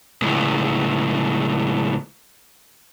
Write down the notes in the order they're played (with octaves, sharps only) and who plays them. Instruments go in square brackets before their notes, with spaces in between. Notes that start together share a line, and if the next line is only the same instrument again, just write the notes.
[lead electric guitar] C#2 A2